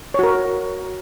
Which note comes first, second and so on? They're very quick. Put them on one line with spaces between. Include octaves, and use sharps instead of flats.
C#5 F#4 A#4